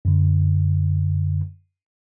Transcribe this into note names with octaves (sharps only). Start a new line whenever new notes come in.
F#2 D3